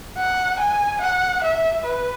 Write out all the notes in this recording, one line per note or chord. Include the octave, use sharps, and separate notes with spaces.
F#5
G#5
F#5
E5
B4